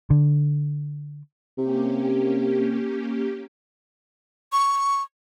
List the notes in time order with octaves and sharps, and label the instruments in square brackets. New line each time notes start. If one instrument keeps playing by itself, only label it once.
[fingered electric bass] D3
[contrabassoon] C3 [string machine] A#3 C#4 G4
[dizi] C#6